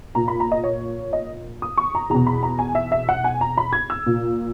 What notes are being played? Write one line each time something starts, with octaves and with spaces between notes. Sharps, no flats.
A#2 A#5
B5
A#5
D#5
C#5
D#5
D#6
C#6
A#5
E2 B2 A#5
B5
A#5
G#5
E5
E5
F#5
G#5
A#5
B5
G#6
E6
A#2